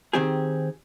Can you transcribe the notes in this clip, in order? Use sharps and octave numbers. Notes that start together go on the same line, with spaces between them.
D#3 C4 G4 G#4